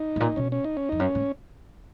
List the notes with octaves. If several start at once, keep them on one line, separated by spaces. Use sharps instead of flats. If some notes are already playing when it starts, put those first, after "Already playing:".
Already playing: D#4
G#2
A#2
B2 C#4
C#4
D#4
C#4
F2 D#4
F#2 C#4
G#2